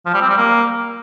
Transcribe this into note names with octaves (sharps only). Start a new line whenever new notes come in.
F3
G3
C4
G3
A#3